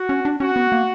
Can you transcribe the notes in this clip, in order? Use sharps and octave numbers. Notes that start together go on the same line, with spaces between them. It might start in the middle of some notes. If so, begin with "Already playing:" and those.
Already playing: F#4
C#4
D4
C#4 F#4
B3
A#3